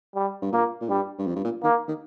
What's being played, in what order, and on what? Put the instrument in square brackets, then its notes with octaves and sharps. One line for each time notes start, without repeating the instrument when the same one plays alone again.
[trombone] G3
[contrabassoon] G2
[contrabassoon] A#2 [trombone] A#3
[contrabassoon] A#2
[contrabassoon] G2 [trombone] G3
[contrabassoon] G2
F2
G2
A#2
[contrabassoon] D#3 [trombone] A#3
[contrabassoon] D#3